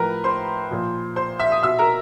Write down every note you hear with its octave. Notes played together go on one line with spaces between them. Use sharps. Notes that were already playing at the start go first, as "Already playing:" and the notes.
Already playing: A2 F3 A#4 B4 A#5
C5 C6
A#2 F3
C5 C6
E5 E6
D#6
B2 E5 E6
A#4 A#5